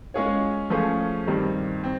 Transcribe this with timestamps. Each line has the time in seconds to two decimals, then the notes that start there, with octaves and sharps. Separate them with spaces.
0.14 G#3 C#4 F4 G#4 C#5
0.70 F3 A3 C#4 F4 G#4
1.27 G2 D#3 G3 C4
1.84 C4